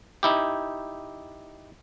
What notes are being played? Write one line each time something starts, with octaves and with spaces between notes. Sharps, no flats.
D#4 E4 G4